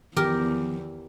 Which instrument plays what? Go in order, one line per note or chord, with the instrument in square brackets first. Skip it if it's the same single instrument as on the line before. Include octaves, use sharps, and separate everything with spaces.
[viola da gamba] E2 [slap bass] D#3 F3 [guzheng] G4 A#4